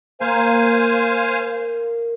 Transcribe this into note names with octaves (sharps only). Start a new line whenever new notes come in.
A#3 C5 F5 G#5